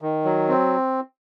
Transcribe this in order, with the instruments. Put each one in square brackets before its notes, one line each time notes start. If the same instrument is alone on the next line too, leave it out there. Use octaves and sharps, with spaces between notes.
[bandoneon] D#3
F#3
C4